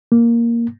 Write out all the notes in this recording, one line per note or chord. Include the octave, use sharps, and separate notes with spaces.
A#3